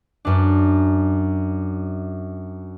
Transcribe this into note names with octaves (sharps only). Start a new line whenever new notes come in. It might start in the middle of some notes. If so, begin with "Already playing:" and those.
F#2 D4